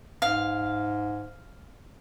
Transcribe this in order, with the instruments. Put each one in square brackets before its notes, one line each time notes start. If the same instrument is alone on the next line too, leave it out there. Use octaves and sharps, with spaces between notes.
[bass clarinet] G#2 [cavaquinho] F5